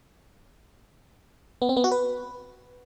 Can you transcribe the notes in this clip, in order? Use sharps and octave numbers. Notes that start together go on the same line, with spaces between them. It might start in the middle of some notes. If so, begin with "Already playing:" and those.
B3
C4
B3
F#4
B4